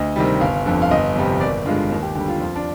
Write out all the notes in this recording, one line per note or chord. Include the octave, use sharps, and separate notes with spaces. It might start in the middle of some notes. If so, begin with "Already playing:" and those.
Already playing: D2 D#5
C3 D#3 G3
G1 F5
F2 D3
F5
G1 D#5
F2 C3 G3
G#1 D5
G2 D3 G#3 F4
D#2 D#4
G4
D3 G3 G4
F4
F2 F4
D4